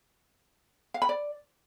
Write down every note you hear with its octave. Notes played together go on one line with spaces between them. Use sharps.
F5
B5
D5